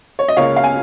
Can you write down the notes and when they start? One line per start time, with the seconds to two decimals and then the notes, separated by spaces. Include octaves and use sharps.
0.19 C#5
0.28 D#5
0.36 C#2 C#3 A#3 C#5 F5
0.56 F5
0.64 G#5